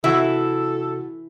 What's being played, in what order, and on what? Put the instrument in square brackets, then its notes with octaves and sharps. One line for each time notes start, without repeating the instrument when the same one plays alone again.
[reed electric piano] C3 F#4 [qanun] E3 [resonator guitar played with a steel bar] E4 E5 [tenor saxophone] A4